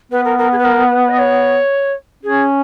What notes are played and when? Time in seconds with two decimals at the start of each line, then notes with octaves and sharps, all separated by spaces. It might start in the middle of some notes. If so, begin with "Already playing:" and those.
0.12 B3 B4
0.25 A#4
0.38 A#4
0.52 G#4
0.58 B4
0.65 A#4
0.91 B4
1.09 D#5
1.18 C#5
2.23 C#4 G#4